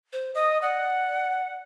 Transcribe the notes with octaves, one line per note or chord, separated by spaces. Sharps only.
C5
D#5 D#6
D5 F#5